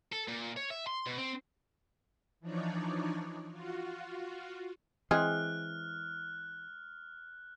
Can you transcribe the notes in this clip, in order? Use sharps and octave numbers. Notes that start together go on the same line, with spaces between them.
A4
A#2
C#5
E5
C6
B2
C4
E3 F3 D4 D#4 C#5 D5
F4 F#4
E3 G#3 C4 G#4 F6 F#6